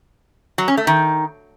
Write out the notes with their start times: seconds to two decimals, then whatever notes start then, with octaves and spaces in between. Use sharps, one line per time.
0.58 F#3
0.68 C#4
0.77 A3
0.87 D#3